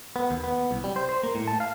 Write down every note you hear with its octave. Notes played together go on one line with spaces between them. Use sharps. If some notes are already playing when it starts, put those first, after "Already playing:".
B3
D#2
B3
C2
G3
C5
C5
A#3
A2
A5
F5